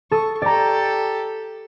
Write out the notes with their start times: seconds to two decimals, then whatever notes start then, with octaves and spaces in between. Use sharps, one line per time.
0.11 A4 C#6 D#6
0.42 G4 A4 D5 A#5